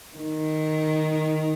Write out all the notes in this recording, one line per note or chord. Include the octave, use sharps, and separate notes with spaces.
D#3